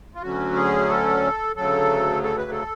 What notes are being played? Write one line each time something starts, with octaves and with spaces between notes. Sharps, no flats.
F4
D2 D3 F#3 C#4 F#4
G#4
A4
D2 C#3 F#3 A4
A4
B4
A4